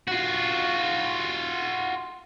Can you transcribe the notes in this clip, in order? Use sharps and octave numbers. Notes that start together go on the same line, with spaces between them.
F4 F#4